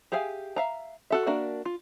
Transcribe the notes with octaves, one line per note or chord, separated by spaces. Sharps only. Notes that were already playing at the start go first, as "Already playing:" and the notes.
G4 G#4 E5 F5 G#5
E5 F5 A#5
F#4 A4 E5
A#3 D4 F#4 A#4 E5
F4